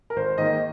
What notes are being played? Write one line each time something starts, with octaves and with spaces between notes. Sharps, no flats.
A#4
G#1 C5
G#2 D#3 A#3 D#4 D#5